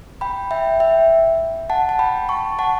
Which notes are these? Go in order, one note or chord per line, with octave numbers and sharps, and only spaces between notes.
G5 B5
E5 G5
E5 G5
F#5 A5
A5
G5 B5
A5 C#6
F#5 A5